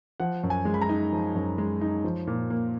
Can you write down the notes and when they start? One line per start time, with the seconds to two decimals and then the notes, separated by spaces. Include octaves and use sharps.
0.20 F3 F#5
0.43 F#2
0.50 G#5
0.65 G#3
0.74 B5
0.81 A#5
0.89 D#4
1.12 F3
1.35 F#2
1.58 G#3
1.81 D#4
2.04 F3
2.27 A#2
2.50 A#3